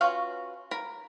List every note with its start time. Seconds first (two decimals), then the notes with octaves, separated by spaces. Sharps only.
0.01 C#4 F4 F#4 B4 F5
0.71 A#4 B5